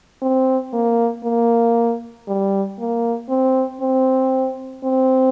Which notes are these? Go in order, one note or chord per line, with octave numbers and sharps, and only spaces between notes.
C4
A#3
A#3
G3
A#3
C4
C4
C4